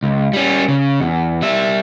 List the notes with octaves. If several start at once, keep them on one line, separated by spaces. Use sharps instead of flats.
C#2
G3 C#4
C#3
E2
G3 E5